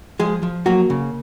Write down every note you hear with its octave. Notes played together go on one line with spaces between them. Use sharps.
F3 G#3 G#4
F3
F#3 A#3 F#4
C#3